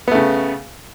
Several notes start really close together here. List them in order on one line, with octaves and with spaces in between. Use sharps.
B3 A3 C#3